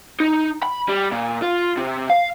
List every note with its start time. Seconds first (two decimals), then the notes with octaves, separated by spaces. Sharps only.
0.20 D#4
0.63 B5
0.89 G3
1.12 A#2
1.42 F4
1.77 C3
2.10 F5